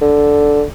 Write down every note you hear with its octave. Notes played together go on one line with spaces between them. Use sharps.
D3